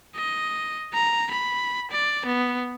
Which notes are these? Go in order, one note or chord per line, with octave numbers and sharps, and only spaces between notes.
D#5
A#5
B5
D5
B3